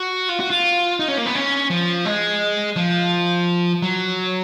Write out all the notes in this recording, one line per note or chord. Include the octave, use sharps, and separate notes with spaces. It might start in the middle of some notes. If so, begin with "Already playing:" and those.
Already playing: F#4
F4
F#4
F4
D#4
C#4
A#3
B3
C#4
F3
G#3
F3
F#3